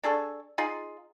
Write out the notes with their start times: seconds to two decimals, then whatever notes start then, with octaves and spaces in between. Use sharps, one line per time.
0.04 D4 G#4 A4 C#6
0.58 D#4 F4 G#4